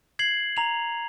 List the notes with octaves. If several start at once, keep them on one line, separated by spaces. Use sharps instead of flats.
G#6 C7 F#7
A#5 F7